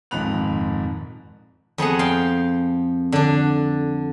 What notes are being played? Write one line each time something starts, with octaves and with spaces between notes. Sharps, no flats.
D#1 F2 G#2 B5 F#6 F7
F2 B3 G#4 F#5
F5 G5 C6
D3 D4